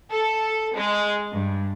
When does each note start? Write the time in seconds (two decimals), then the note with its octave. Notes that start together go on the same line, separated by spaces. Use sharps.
0.11 A4
0.76 G#3
1.33 G2